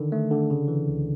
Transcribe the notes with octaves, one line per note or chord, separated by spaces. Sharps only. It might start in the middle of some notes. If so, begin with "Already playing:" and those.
Already playing: D3 D#3
A3
D3
C#3
E3
C#2